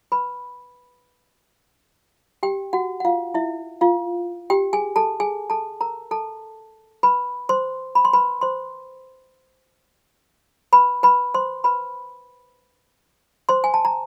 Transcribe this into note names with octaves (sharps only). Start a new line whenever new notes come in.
B4 B5
G4 G5
F#4 F#5
F#5
F4 F5
E4 E5
F4 F5
G4 G5
G#4 G#5
A4 A5
G#4 G#5
A4 A5
A#4 A#5
A4 A5
B4 B5
C5 C6
B5
C6
B4 B5
C5 C6
B4 B5
B4 B5
C5 C6
B4 B5
C5 C6
G#5
A5
A#5